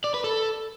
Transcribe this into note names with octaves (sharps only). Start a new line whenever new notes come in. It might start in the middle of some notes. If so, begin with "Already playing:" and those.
D5
B4
A4